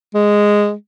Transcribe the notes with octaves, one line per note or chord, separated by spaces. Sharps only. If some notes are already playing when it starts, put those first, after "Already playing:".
G#3